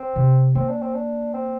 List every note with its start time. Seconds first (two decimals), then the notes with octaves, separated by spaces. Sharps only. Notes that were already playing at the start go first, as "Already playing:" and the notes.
Already playing: C4
0.16 C3
0.55 A#3 C4
0.69 D4
0.82 C4
0.94 D4
1.34 C4